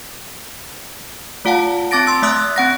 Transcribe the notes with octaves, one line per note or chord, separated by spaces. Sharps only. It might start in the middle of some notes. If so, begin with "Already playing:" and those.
A3 F4 F5 F#5 A5
C4 A5 D6 A6 A#6 D7
C6 E6
A3 E5 D#6 F#6
C4 F#5 A#6